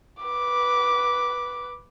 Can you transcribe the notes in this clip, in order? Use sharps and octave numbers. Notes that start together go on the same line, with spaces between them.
B4 D6